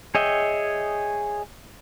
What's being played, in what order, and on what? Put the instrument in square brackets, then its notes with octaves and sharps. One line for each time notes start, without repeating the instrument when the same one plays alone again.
[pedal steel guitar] G#4 C#5 D#5 E5 G5